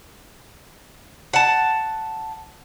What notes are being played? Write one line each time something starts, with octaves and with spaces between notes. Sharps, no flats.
F#5 A5